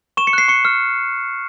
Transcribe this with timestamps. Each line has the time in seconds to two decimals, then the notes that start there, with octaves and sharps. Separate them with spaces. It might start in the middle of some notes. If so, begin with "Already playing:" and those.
0.17 C#6 E7
0.27 C#7
0.33 F#6 C7
0.48 C#6 C#7
0.65 F6